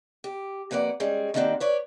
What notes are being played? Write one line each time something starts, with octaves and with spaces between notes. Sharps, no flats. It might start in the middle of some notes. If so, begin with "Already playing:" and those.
G4
F2 A#3 B4 D5 F#5
G3 G#3 C#4 G#4
D#3 A#3 C4 D4 F#4 G4
B4 C#5 D5